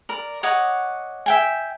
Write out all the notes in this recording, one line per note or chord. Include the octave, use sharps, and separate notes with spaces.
A#4 D5
C#5 D#5 F#5 D6
E5 G5 G#5